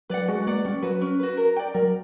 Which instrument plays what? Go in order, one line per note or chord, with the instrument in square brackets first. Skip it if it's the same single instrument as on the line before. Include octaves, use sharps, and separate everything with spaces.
[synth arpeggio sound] F#3 [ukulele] B4 D5 F#5
[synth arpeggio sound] G#3 [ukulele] F#4
[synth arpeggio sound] A#3 [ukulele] B4 D5 F#5
[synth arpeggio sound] G3 [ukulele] C#4
[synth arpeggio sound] F#3 [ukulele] F#4 B4
[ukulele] C#4
F#4 B4
A#4
D5 G5
[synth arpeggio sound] F#3 [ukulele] A#4